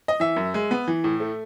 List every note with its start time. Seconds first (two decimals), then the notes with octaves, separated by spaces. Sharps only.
0.08 D#5
0.20 E3 E5
0.36 F#2
0.54 G#3
0.71 B3
0.88 E3
1.04 A2
1.20 A3